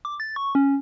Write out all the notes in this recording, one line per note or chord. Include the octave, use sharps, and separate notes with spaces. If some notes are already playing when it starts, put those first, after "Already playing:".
D6
A6
C#6
C#4